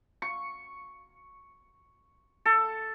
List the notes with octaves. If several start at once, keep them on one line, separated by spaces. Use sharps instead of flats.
C#6
A4